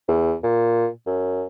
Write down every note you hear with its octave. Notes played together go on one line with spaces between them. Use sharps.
E2
A#2
F#2